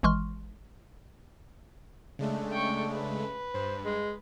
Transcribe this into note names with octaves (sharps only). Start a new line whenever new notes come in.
G#1 E3 G#3 C6 C#6 F6
C#3 G#3 A3 D4
G5 C#6
B4
G2 C5
G#3